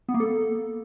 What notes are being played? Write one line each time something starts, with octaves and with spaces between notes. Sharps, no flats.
B3
A#3
A4